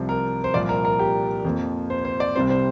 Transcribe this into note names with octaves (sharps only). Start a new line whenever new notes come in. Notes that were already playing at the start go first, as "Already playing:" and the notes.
Already playing: C2 C3 F3
A#4
C5
C2 A#2 F3 D5
A#4
A#4
G4
F2 F3 A#3
C5
C5
D5
C2 C3 G3 C4 C5
C5